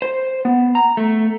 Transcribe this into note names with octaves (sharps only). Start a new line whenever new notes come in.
C5
B3
A#5
A3